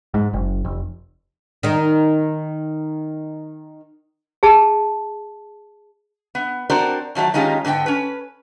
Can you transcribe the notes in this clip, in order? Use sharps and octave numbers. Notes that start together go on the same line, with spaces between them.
G#2
F#1
F1
D#3 D#4
G#4 A5
B3
C4 D4 F#4 A#4 C5 D5
D#3 F3 F#3 A3
D#3 G#3 C#4 D#4 F4 G4
G#2 D3 B3 G5
C#4 B4